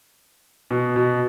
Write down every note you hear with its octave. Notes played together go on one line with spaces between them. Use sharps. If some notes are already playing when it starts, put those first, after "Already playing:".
B2
B2